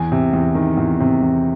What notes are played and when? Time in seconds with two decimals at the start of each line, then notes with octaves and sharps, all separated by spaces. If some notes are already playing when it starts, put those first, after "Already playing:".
Already playing: E2 G#5
0.12 C3
0.33 E2
0.55 D#3
0.77 E2
1.00 C3
1.23 E2